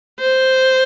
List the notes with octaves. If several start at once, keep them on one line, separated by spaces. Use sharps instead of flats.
C5